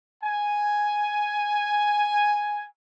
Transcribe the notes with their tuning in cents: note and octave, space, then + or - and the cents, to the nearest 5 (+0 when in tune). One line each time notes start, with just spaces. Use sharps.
G#5 +0